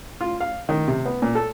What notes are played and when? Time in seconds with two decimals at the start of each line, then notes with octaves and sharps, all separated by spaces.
0.21 F4
0.41 F5
0.69 D#3
0.88 C3
1.06 B3
1.22 A#2
1.35 A4